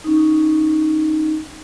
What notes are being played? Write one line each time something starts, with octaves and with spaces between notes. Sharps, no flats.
C#4 D#4